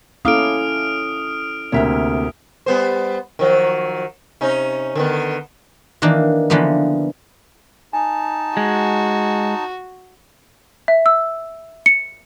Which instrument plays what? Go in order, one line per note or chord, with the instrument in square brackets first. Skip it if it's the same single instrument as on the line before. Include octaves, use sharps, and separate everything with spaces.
[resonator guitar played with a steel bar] A#3 F5 [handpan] C#4 E4 A4 [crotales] D#6 F6 D7
[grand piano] D2 C3 A#3 [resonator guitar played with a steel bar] C#5 E5 G5
[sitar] G3 B3 C5
D#3 F3 F#3
C3 C#4 D#4
D3 D#3 B3
[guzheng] D#3 E3 A#3 D4
D3 E3 F3 A#3 B3
[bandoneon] D#4 A5 [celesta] G#5
[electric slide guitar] G#3 [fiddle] F#4
[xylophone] E5
E6
C#7